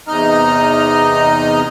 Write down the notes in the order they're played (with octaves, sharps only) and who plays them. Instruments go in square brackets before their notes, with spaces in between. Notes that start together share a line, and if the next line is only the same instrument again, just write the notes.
[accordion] E2 C3 D#4 D#5 A#5 F6